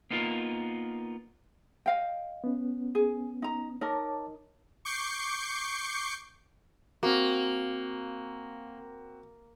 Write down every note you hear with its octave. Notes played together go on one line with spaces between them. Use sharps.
A#3 B3 D#4 F4 A#4
D#5 F5 G5
B3 C#4
G#4
D#4 A#5
D#4 A#4 C#5 A5 D6
C#6 D6 G6 C7 C#7
A#3 C4 F#4